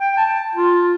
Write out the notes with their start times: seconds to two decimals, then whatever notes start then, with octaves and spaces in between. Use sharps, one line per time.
0.01 G5
0.17 A5
0.55 F4